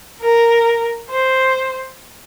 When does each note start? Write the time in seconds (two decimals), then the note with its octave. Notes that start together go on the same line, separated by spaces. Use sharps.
0.21 A#4
1.10 C5